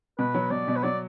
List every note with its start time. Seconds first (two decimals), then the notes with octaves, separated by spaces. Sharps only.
0.19 B2 B4
0.34 F#3
0.51 B2 D5
0.68 B2
0.76 B4
0.83 F#3 D5